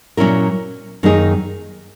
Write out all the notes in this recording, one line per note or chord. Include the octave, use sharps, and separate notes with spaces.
A#2 F#3 C#4 E4 A#4
F#2 D#3 A#3 D#4 G#4